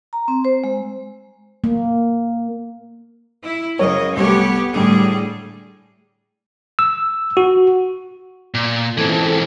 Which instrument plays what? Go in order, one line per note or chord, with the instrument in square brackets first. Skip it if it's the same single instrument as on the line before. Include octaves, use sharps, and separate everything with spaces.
[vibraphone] A#5
C4
C5
G#3
[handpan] A#3
[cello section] E4
[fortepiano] F#2 A#4 C#5 [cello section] C#3 D#5
[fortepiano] C2 A3 [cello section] B3 G4 C#5
[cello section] A2 G3 G#4 [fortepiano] D3
[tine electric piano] E6
F#4
[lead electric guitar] A#2
[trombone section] C#2 C4 A4 [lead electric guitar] G#2 E3